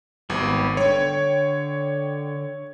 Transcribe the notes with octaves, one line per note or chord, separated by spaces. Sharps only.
G#1 G3 B3 G4
D3 C#5 G5